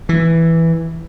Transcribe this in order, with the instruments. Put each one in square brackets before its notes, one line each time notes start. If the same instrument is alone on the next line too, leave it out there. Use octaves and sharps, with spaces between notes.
[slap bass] E3